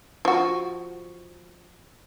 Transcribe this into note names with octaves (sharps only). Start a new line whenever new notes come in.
F3 F#4